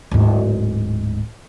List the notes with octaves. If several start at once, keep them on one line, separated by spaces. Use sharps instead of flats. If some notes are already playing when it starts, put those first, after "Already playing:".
D1 G#2